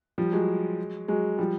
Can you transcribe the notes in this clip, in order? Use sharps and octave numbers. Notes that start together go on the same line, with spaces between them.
F3 G3
F#3 G#3
F#3 G#3
F3 G3